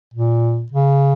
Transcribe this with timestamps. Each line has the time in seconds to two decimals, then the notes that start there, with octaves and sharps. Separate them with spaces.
0.14 A#2
0.72 C#3